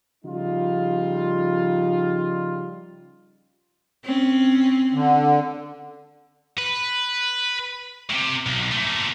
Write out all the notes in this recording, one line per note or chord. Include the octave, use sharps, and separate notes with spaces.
C#3 F3 G3 D#4 F4
C4 C#4
D3
B4
A2 C3
B1
A#2 A3